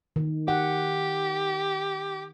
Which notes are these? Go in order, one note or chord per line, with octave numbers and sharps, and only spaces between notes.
D#3
G4 F#5